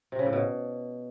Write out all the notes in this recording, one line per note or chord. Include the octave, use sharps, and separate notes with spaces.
C3
C#3
A2
B2